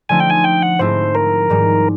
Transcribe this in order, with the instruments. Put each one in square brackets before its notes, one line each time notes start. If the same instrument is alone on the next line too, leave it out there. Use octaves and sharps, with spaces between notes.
[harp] D3 F3 A3 C4 D#4 [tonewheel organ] G#5
[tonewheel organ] G5
G#5
G5
F#5
[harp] G#2 F3 A3 C4 E4 [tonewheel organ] C5
[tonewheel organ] A#4
[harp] G#2 D#3 G3